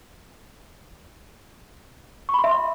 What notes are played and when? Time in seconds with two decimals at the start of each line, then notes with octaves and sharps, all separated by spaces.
2.29 C#6
2.34 B5
2.39 C6
2.44 E5